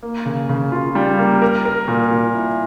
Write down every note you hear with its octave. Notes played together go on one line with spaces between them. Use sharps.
A#3
C#3
C#3
F4
G3
A#3
A#4
A#4
A#2
A#2
E4